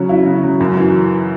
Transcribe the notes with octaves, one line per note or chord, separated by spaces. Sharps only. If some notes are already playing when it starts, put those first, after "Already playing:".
Already playing: C#3 F#3 C#4
E4
C#3
F#3
F#2
E3